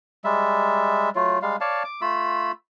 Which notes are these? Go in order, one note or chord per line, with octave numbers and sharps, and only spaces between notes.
G3 G#3 E5
F#3 A3 F4
G3 G#3 F5
C#5 D5 F5 A5
D6
A3 F4 B5 E6